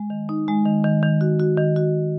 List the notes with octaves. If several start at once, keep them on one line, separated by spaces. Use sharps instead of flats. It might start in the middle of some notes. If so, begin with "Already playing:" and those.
Already playing: G#3
D#3
D#4
G#3
D#3
D#3
D#3
F#4
F#4
D#3
F#4